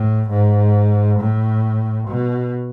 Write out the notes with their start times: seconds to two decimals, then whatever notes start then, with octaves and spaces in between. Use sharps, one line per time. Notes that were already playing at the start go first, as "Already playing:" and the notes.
Already playing: A2
0.30 G#2
1.19 A2
2.08 B2